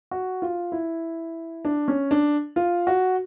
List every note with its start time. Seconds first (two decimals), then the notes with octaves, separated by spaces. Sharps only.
0.11 F#4
0.42 F4
0.72 E4
1.65 D4
1.88 C#4
2.11 D4
2.56 F4
2.87 F#4